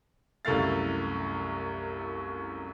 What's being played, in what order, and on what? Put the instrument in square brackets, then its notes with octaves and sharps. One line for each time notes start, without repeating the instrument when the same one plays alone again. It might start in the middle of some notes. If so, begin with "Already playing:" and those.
[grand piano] C2 F#2 A3 E4 F5 A6